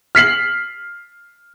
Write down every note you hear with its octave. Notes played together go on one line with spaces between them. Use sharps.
F6 B6 C7 F#7